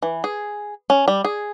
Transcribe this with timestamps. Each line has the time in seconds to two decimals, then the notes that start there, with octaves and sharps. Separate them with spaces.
0.02 E3
0.24 G#4
0.90 C#4
1.08 G3
1.25 G#4